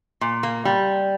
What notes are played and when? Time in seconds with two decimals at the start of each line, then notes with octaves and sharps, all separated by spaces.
0.21 A#2
0.43 A#3
0.65 G3